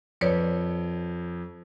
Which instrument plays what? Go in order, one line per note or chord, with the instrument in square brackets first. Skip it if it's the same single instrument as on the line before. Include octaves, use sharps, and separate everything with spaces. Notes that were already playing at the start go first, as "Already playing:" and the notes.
[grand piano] F2 [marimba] B4 C#5 D5